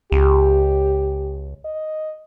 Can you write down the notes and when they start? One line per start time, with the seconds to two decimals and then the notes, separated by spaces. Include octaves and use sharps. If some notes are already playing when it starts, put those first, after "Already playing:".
0.12 C#2 G4
1.65 D#5